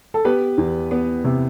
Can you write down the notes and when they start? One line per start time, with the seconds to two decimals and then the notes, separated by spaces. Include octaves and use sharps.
0.14 A4
0.25 B3 G4 B4
0.58 E2
0.91 B3
1.24 C3